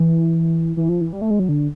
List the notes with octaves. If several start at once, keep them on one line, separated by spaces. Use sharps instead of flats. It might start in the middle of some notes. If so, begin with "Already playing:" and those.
Already playing: E3
E3
F3
E3
G3
A3
G#3
F#3
D3